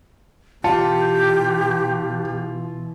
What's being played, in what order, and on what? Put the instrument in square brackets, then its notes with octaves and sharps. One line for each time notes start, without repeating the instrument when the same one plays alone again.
[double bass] B2 E3 [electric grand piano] F4 C#7 [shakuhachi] G4 [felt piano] A5